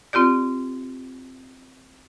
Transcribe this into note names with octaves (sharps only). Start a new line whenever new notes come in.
C4 F4 G4 D5